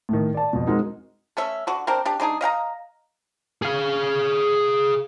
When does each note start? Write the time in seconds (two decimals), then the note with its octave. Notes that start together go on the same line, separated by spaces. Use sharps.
0.09 A2 D#3
0.34 D5 A5
0.53 F2 B2
0.67 G#3 C4 D#4 F#4 G#4 A#4
1.37 A3 C#4 E5
1.67 D3 F#4
1.87 C4 D4 A#4 C5
2.05 D4 G4
2.20 G#3 D4 D#4 G#4
2.41 D#5 F5 G5 A#5
3.62 G#4 F5